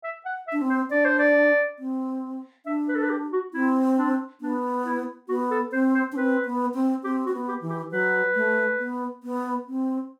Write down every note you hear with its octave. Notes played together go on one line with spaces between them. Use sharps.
E5
F#5
E5
D4
C4
C5
D4 D5
C5
D5
C4
D4 E5
B4
A4
B4
G4
F#4
C4 E4
D4
B3 D4
E4
B3 F#4
A4
C4 C5
C5
D4
C4 B4
B3
C4
C4 G4
C4 F#4
B3
G4
E3
G4
F#3 B4
A3
B3
B3
C4